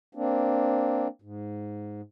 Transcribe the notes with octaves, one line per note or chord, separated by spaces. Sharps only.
A#3 C4 D4
G#2